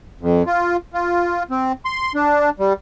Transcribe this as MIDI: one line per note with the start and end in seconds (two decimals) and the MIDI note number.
0.21 0.43 41
0.46 0.77 65
0.93 1.43 65
1.51 1.72 60
1.85 2.12 84
2.15 2.50 62
2.60 2.73 55